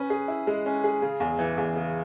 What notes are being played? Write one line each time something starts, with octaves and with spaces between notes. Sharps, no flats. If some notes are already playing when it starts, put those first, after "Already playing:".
Already playing: C#4 B4
G#4
E4
G#3
C#4
G#4
C#3
E2
E3
E2
C#3